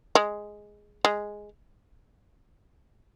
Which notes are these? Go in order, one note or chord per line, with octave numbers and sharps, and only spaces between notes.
G#3
G#3